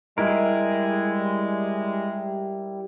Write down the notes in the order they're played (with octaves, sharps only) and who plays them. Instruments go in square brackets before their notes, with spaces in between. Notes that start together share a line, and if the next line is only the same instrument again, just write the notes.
[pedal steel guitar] G3 E4 A#4 [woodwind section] G#3